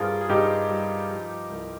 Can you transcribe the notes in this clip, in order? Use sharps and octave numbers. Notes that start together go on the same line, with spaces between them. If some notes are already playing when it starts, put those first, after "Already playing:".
Already playing: G2 C4 F4 G#4 A#4
G#4
G2 D#4 G4
G3
F3
C2